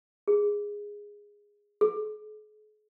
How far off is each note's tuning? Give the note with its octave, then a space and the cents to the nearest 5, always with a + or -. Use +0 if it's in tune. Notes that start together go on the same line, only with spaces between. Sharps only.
G#4 -10
G#4 +45